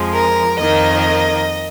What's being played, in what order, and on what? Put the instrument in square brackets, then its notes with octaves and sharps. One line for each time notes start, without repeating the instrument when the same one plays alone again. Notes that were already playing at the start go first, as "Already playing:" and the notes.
Already playing: [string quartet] F2 F3 G#3
A#4
F2 D#3 A#3 D#5